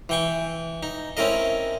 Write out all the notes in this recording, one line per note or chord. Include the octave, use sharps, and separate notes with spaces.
E3 G5 C#6
D#4
C4 C#4 E4 A#4 D#5